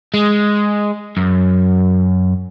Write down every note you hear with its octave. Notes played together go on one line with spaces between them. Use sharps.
G#3
F#2